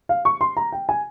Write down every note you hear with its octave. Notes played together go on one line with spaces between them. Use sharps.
F5
C#6
C6
A#5
G5
G#5